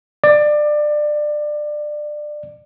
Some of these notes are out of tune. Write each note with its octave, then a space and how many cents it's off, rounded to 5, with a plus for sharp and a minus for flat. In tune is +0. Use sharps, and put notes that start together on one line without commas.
D5 +25